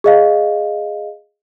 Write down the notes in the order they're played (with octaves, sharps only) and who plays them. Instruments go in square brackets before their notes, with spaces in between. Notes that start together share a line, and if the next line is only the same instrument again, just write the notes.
[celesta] G#4 D#5 F5